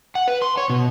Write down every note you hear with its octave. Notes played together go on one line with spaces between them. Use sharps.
F#5
B4
C6
C#5
B2